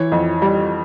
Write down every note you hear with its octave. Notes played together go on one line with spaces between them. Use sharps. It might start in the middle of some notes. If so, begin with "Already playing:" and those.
Already playing: E3 C#5
F2
G3